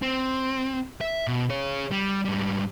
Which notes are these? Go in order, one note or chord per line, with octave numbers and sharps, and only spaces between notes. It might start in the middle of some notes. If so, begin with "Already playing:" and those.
C4
E5
B2
G#4 C#5
G3
G#2 G3